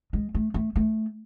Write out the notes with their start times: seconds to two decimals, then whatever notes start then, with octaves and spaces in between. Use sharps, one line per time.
0.13 G#3
0.35 A3
0.54 A3
0.76 A3